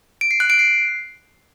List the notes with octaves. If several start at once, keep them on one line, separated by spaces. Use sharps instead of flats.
D7
C7
F#6
D7
C7